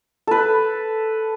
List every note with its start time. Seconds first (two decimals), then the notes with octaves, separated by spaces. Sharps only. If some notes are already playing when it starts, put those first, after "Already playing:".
0.27 A4 B4